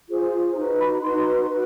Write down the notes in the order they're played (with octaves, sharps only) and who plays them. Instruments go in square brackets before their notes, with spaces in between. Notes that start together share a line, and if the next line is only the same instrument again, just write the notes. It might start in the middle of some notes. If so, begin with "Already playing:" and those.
[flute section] F4 G#4 C5
D#4 F#4 B4 A#5
B5
D#4 F#4 B4 C6
F#4 B4